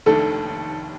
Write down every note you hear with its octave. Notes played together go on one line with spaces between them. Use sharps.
F1 D#2 D#3 A3 D4 A4